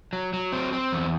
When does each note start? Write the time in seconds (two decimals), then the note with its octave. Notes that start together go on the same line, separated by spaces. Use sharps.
0.13 F#3
0.33 F#3
0.52 C4
0.73 C4
0.92 E2